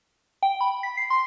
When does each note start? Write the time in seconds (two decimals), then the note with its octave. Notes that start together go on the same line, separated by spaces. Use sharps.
0.43 G5
0.61 B5
0.83 B6
0.97 C7
1.10 C6